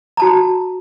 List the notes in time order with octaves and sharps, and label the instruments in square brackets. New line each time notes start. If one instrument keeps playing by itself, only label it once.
[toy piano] F#4 A5 A#5